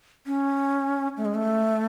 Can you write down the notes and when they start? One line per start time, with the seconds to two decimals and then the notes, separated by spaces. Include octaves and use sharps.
0.26 C#4
1.17 A3
1.25 G#3
1.35 A3